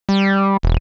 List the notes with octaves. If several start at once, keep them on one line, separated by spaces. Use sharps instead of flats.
G3
E1